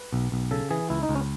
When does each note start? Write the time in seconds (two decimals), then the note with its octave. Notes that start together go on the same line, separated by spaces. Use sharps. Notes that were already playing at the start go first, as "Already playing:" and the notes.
Already playing: B4
0.13 B1
0.32 B1
0.51 C#3 A4
0.70 E3 G#4
0.90 C#2 E4
1.03 D#4
1.09 C#2
1.15 C#4